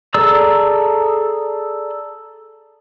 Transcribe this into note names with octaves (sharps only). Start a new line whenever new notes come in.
G#4 A4 D5 A#5 E6